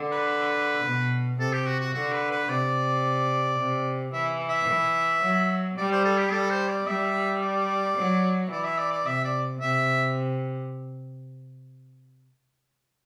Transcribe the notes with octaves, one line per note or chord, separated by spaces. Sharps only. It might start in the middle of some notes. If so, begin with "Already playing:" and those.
Already playing: D3
B4
B2
C3 A4
G4
F#4
F#4
D3 F#4
B4
B4
C3 D5
C3
E3 E5
E5
E3
F#3
G3 D5
C5
A4
G4
G3 A4
C5
D5
G3 E5
D5
F#3
E3 D5
E5
D5
D5
C3 E5
D5
C3 E5